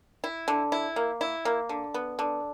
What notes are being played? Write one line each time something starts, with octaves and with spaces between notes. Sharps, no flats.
E4
D3
E4
A#3
E4
A#3
D3
B3
D3